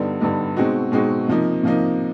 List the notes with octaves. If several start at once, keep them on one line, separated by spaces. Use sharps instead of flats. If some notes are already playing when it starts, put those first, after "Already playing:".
Already playing: G2 D3 G3 B3 D#4
G2 D3 G3 B3 D#4
B2 G#3 C4 D#4 F#4
B2 G#3 C4 D#4 F#4
C3 F3 A#3 D#4
C3 F3 A#3 D#4